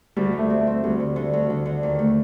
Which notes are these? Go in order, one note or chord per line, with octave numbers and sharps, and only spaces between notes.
D2 G3
D3
A3
C4
A3
C4
D2 G3
D3
D3
D2
D3
D3
D#2
A3